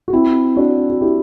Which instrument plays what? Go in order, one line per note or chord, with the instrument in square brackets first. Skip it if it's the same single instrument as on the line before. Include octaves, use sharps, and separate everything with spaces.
[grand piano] F#4
C4 E4
D4 F#4
F#4
E4 G4